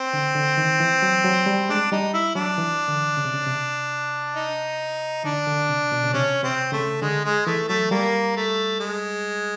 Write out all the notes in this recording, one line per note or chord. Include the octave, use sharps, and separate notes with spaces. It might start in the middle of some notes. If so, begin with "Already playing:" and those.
Already playing: C4
D3
D3
D#3
E3
F#3
F#3
G3
G#3 D4
G3 D#4
E4
F#3 D4
E3
D3
C#3
C3
C#3
C3
D#4
D3 D4
D3
C3
B2
C#3
C3 C#4
C3 C4
C#3 A3
D3 G#3
G#3
E3 A3
F#3 A3
G3 A#3
A3
G#3